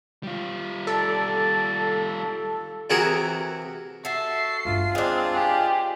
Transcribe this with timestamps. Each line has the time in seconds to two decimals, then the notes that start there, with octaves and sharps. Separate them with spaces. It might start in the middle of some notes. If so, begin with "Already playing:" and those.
0.23 G3 F4
0.87 A4 D5
2.90 C3 E3 F#4 G#4 A#4
4.05 F#4 A4 E5 A5 C7
4.65 G#1 C#2 G2 F4
4.95 G#3 C4 D4 F5 F#6
5.32 G4 G#4